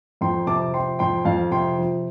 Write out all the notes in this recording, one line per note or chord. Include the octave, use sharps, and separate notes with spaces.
F2 G5 C6
C3 A5 D6
F3 G5 C6
F2 G5 C6
F2 F5 A5
C3 G5 C6
F3